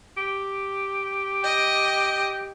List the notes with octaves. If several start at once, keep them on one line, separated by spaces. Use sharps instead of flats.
G4
D#5 G5